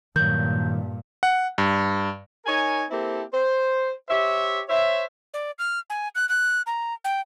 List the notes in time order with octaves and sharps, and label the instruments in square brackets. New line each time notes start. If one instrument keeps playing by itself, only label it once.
[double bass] G2 A#2 [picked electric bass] D#3 F#3 [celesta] G6
[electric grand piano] F#5
G2
[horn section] D#4 A#4 C#5 G#5
A#3 C4 E4 G4 A4
C5
G4 C5 C#5 E5
C5 C#5 E5
[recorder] D5
F6
G#5
F#6
F#6
A#5
G5